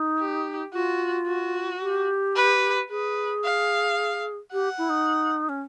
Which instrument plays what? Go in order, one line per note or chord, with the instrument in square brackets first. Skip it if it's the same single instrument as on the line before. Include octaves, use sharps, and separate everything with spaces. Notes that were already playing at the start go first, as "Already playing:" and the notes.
Already playing: [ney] D#4
[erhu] G4
[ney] F4 [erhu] F#4
[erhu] F#4
[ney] G4
[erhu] B4
[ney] G#4 [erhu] B4
[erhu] F5
[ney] G4 [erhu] F#5
[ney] E4
D#4
C#4